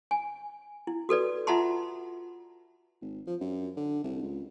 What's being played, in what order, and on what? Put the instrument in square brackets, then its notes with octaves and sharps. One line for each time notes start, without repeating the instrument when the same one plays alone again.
[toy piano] G#5
E4
F#4 A4 B4 D5
F4 E5 F#5 A5 A#5 C6
[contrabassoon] G#1
F3
F#2
D3
C2
C#2